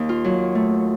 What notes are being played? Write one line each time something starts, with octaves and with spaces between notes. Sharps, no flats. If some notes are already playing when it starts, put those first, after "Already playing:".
Already playing: D#2 G4
F4
F#3
A3